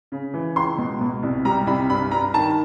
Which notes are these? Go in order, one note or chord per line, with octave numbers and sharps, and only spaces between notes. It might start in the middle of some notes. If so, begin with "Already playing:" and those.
C#3
E3
C#2 C6
B2
B2
C2
G3 A#5
C2 B5
G2 B5
G2 A#5
D#3 A5